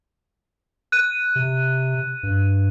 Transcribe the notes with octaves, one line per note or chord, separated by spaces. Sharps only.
F#6 D#7
C3
G2